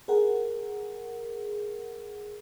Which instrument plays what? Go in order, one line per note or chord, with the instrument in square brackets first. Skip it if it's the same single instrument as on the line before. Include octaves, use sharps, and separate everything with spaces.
[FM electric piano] G#4 A#4 F#5